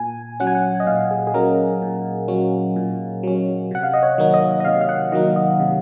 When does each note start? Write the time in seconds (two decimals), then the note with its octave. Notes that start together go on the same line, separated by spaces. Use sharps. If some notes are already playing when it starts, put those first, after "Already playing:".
Already playing: A#2 G#5
0.40 F#3 C#4 F#5
0.47 G#5
0.55 F#5
0.80 D#5
0.87 A#2 F5
1.11 G#4
1.27 G#4
1.34 F#3 C#4 A#4
1.82 A#2
2.28 F#3 C#4
2.76 A#2
3.23 F#3 C#4
3.71 C3 F#5
3.83 F5
3.93 D#5
4.03 C#5
4.18 D#3 F#3 A#3 D#4
4.34 D#5
4.60 D#5
4.65 C3 F5
4.81 F5
4.89 F#5
5.12 D#3 F#3 A#3 D#4 D#5
5.36 D#5
5.60 C3